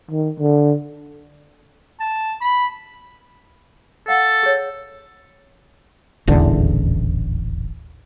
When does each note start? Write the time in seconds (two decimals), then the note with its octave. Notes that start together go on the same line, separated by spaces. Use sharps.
0.11 D#3
0.40 D3
2.00 A5
2.41 B5
4.08 A4 F5 F#5
4.43 G#4 C#5
6.28 D#1 A1 E2 D3